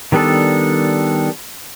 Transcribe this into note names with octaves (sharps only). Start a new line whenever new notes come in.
D#3 G3 B3 D4 A4